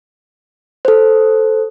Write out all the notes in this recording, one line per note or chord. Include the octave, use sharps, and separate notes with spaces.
A4 C5